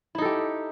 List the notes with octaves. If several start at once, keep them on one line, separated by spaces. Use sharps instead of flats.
D#4 E4 G4 A4